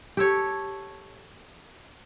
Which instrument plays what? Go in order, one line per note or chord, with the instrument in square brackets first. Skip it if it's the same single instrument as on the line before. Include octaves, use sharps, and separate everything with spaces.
[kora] G4 A4 C#5